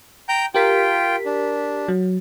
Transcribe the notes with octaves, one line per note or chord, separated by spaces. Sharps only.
G5 A#5 G6
F4 G4 A#4 G5 B6
D4
F#3